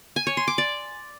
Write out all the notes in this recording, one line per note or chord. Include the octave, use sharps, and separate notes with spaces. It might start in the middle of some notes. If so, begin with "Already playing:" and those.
G#5
C#5
C6
D6
D5